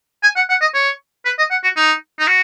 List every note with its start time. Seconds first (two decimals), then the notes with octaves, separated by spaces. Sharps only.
0.23 G#5
0.36 F#5
0.50 F#5
0.61 D#5
0.74 C#5
1.25 B4
1.39 D#5
1.51 F#5
1.63 F#4
1.76 D#4
2.19 D#4
2.27 F#4